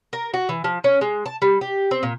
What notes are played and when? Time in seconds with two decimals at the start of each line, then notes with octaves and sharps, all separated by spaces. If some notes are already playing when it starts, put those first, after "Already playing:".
0.13 A#4
0.34 F#4
0.49 E3
0.64 F3
0.84 C#4
1.01 G#3
1.26 A5
1.42 G3
1.61 G4
1.91 C4
2.03 A#2